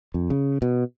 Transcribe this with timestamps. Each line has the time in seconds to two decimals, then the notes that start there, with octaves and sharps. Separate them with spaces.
0.14 F2
0.30 C#3
0.62 B2